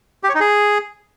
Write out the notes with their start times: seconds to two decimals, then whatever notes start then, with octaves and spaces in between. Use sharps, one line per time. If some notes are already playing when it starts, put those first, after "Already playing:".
0.23 G4
0.29 C#5
0.35 D#4
0.40 G#4